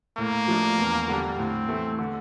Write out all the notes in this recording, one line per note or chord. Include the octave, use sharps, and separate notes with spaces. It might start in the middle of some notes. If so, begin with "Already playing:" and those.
A2 A#3
F3 A3 D4
E2
D3 G3 D4
A2 C4
E3 A3
D3